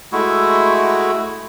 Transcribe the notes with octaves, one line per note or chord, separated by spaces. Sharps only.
G#3 A3 E4 F#4